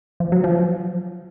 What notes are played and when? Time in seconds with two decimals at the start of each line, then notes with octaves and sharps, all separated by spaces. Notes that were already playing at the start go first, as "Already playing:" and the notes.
0.20 F3
0.32 F#3
0.44 F3